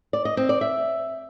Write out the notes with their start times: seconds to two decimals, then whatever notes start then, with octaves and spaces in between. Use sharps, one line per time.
0.13 D5
0.25 D#5
0.37 C4
0.49 D5
0.61 E5